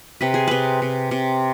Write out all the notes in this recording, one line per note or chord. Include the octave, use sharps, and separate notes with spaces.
C3 B4
G#4
C3 B4
C3
C3